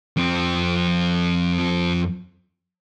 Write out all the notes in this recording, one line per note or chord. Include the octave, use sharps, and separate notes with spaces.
F2 C4